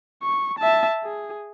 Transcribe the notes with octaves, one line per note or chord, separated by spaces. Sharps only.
C#6
E5 A5
G#4